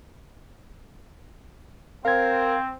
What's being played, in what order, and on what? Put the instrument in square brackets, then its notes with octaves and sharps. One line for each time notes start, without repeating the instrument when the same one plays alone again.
[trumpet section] C4 [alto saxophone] A#4 [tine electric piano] F5 G#6